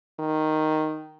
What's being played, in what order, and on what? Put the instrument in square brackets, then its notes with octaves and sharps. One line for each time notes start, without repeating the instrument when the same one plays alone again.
[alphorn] D#3